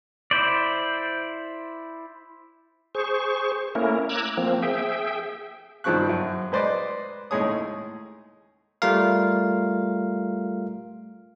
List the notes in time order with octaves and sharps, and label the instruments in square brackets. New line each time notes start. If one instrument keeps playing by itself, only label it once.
[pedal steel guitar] E4 C5 D5
[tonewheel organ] G#4 C5 C#6
A3 A#3 C#4 E4 A#4
A#5 D6 E6 F#6 G#6
F3 A#3 C4
G#4 E5 G5
[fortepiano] G2 D#3 F3 C4 C#6 F#6
F#2
G#3 B4 C5 D5 D#5 D6
D#2 A2 G#3 G#4 C#5 D#6
[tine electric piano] G3 A3 F4 A#4 F5